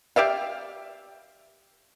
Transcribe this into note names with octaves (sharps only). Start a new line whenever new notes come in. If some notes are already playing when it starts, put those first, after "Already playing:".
G4 D5 E5 F5